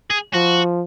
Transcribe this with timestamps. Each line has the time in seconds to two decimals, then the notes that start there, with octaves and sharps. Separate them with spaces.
0.10 G#4
0.34 F3 F#4